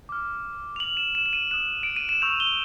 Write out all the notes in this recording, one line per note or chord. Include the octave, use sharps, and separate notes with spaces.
D6 F6
F7
D6 F6 F#7
E7
E7
E7
D#7
D#6 F#6 E7
D7
D#7
E7
C#6 E6 G6 F7
G7